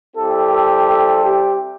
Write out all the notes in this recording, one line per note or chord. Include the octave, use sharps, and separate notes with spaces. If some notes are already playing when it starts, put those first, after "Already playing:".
G3 C4 E4 G4 A4
A4
A4
G4